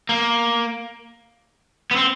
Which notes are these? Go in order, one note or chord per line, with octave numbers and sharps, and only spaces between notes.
A#3
B3
C4